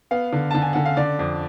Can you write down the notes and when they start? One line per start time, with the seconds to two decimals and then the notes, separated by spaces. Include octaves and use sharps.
0.11 B3 F5
0.33 D3
0.51 D3 A5
0.62 G#5
0.73 D3 F#5
0.85 F5
0.97 D3 D5
1.19 F2